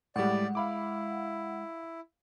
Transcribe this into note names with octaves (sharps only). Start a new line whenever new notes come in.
A2 G3 G#3 D5 F#5
E4 F5 B5 D6